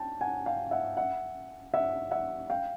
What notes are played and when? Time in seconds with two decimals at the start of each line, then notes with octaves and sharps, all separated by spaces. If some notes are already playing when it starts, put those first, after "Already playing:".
Already playing: G5 A5
0.21 F#5 G#5
0.46 F5 G5
0.71 E5 F#5
0.97 E5 F#5
1.74 E5 F#5
2.11 E5 F#5
2.50 F5 G5